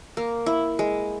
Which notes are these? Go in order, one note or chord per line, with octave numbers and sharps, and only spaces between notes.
A#3
E4
G#3